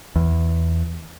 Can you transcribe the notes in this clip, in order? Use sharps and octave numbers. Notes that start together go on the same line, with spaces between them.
E2